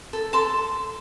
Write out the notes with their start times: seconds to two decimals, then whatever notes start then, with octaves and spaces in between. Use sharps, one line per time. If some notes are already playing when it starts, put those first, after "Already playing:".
0.13 A4
0.33 A4 A5 C6